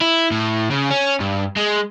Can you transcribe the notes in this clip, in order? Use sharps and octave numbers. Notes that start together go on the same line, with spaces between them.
E4
A2
C#3
C#4
G2
G#3